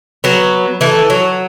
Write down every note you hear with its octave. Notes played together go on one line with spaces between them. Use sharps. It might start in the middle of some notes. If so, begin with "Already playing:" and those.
F#3 B3
E3 A3
F#3